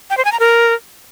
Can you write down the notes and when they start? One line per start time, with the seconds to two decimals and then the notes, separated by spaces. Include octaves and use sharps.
0.10 G5
0.17 C5
0.25 G#5
0.32 A#5
0.40 A#4